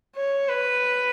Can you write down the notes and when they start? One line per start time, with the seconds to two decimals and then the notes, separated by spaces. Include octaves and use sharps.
0.16 C#5
0.48 B4